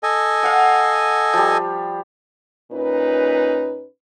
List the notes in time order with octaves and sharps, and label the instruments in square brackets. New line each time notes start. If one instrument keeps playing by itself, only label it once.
[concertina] A4 D#5 G#5
[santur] F5 F#5
F3 G3
[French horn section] A#2 C#4 D#4 B4